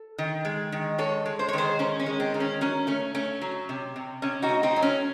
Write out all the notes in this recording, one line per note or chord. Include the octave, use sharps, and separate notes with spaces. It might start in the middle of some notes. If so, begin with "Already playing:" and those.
Already playing: A4
D#3
G#3
D#3
G#3 A4 C#5
G#3
C5
C#5
D#3 G#4 C5
D#3 C#4
C#4
G#3
C4
D#3
C#4
F#3 C#4
A3 C#4
A3 C#4
F#3
C3
C3
C3 C#4
D#4 F#4
A3
C4 D#4
F#3
C#4